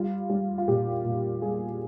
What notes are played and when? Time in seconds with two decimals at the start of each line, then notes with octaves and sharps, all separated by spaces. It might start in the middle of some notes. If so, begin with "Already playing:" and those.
Already playing: G3 F4
0.30 G3
0.58 F4
0.68 A#2 G4
1.04 A#2
1.42 G3 G#4